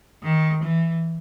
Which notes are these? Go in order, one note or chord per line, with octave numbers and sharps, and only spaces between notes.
D#3
E3